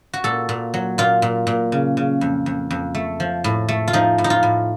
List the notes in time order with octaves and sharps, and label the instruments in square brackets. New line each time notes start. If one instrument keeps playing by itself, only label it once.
[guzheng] F#4
A#2 A4
A#2
F#3
A#2 F4
A#2
A#2
C#3
C#3
F2
F2
F2
A3
F3
A2
A3
F4
F3 D#4
A2
D#4
F4
A2